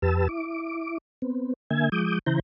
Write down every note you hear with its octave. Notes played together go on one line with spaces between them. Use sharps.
F2 G4 B4 A5 E6
E4 D6
B3 C4
D3 A#3 E5 G#5 G#6
F3 G#3 D6 D#6 G6
C#3 E3 E4 C5 A#5 G6